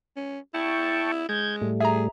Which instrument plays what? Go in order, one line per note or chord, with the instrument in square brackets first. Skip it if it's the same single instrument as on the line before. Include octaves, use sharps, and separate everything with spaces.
[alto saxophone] C#4
[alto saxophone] E4 [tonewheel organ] G5 A5 C#6
[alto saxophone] G#3 [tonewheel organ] G6 G#6
[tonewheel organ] A2 G3 A3
[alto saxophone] G#4 [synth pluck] E5 A#5